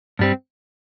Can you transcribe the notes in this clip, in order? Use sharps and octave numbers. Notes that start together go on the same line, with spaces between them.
G2 G3 C4